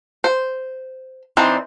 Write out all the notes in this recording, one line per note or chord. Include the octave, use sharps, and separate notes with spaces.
C5
E3 C4 D4 D#4 C5